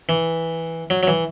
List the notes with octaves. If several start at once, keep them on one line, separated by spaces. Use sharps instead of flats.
E3
F#3
F#3
E3